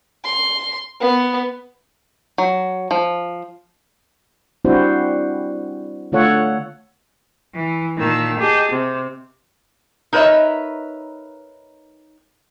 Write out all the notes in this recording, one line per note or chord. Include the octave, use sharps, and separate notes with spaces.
C6
B3
F#3
F3
G3 C4 D4 E4 F#4 C5
D3 A3 F4 A4 C#5 F#5
E3
A#2 D#3 A5 E6
G4 G#4 D#5 A5
C3
D#4 A#4 B4 C#5 D#5 E5